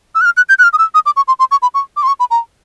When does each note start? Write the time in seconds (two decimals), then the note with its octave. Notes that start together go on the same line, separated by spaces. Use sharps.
0.15 E6
0.21 F#6
0.25 F6
0.37 F#6
0.49 G6
0.59 F#6
0.63 F6
0.73 D#6
0.78 E6
0.94 D#6
1.06 D6
1.16 C#6
1.28 C6
1.39 C6
1.51 C#6
1.62 B5
1.74 C#6
1.96 D6
2.03 C6
2.07 C#6
2.20 B5
2.31 A#5